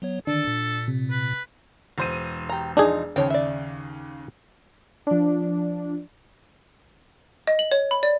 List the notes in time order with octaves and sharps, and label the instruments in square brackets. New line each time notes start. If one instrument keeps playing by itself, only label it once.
[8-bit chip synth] F#3 B3 C#5
[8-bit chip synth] D3 D#3 [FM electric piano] D4 [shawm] A4
[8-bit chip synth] A#2
[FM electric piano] C3
[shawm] B4
[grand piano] E1 C5 D#7
[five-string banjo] G4 A#5
[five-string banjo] F3 D#4 [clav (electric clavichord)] D4 G#4
[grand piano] D#2 C#3 [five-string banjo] F3 C#5 G5
[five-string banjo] D5 E5
[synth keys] F3 D4
[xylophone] D#5
F#7
C#5
B5
D5